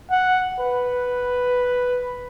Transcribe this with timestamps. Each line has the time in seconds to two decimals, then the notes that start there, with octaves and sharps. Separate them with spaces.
0.11 F#5
0.59 B4